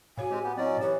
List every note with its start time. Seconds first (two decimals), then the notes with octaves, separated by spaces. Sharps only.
0.17 A2 F#4 C#5 F5 G#5
0.31 G#3 C4 G4
0.44 B3 G4
0.57 F#3 C4 C#4 E4 D5 D#5
0.81 E3 G4 C#5